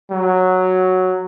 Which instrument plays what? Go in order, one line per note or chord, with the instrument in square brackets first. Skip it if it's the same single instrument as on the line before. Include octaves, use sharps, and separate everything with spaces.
[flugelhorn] F#3